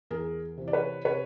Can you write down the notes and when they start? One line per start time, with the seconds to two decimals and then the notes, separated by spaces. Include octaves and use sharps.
0.10 E2 G#4 A#4
0.58 C3 E3
0.68 D5
0.73 B4 C#5
1.05 C3 B4 C#5